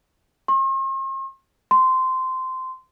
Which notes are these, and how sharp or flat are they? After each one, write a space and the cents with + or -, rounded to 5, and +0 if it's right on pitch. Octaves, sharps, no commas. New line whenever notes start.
C6 +45
C6 -15